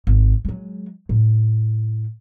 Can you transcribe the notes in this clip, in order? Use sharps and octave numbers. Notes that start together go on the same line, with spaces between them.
G#1
F#3 G#3
A2